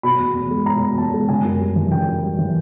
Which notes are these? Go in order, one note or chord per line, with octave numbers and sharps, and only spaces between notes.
B2 B5
E2
E2
G#3
B2 A#5
E2
E2 A5
G#3
C#3 G#5
F#2
G3
E3
C#3 G5
F#2
G3
E3